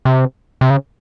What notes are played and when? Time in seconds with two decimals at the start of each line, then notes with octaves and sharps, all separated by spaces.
0.05 C3
0.61 C3
0.70 C#3